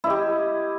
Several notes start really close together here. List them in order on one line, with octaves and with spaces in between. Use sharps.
E4 D#5 G4